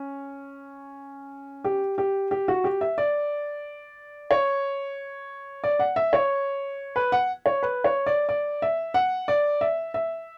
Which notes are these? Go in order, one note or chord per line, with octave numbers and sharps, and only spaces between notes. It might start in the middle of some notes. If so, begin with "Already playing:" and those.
Already playing: C#4
G4
G4
G4
F#4
G4
E5
D5
C#5
D5
F#5
E5
C#5
B4
F#5
C#5
B4
C#5
D5
D5
E5
F#5
D5
E5
E5